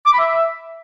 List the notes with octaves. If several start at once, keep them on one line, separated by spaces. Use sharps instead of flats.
D6
B5
E5